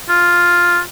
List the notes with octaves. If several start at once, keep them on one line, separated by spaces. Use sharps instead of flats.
F4